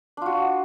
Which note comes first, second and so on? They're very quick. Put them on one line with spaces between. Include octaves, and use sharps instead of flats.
D4 F4 F#4